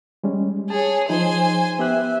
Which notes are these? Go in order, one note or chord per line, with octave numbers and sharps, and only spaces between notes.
G3 G#3 C#4
G#4 C#5 G#5 A5
F3 D#4 C5 G#5
B3 G4 E5 F#6